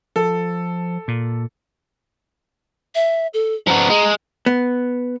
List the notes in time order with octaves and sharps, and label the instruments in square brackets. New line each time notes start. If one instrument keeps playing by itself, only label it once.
[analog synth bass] F3 [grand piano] A4
[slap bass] A#2
[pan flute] E5
A4
[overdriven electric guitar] F3 B3 [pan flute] A#5
[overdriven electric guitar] G#3
[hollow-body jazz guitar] B3